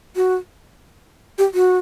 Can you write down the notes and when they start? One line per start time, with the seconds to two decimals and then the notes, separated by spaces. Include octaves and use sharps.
0.16 F#4
1.38 G4
1.54 F#4